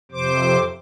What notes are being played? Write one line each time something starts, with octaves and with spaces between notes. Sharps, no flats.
F2 C3 C5 D6